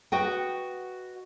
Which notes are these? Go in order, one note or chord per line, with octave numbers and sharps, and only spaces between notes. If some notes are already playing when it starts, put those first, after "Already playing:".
F#4 B4 D#5 F#5 G5